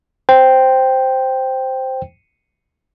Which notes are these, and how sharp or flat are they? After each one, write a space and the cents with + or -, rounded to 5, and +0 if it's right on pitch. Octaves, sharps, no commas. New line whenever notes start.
C5 +0 G5 +0